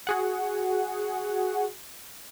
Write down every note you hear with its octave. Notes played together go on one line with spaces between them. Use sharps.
F#4 G#4 F#5